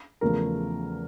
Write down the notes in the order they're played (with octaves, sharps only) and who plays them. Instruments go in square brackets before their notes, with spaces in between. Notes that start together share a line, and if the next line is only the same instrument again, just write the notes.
[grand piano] E2 C#3 F3 A3 A#4